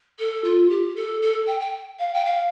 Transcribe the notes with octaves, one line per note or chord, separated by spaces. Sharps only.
A4
F4
G4
A4
A4
G5
G5
F5
G5
F5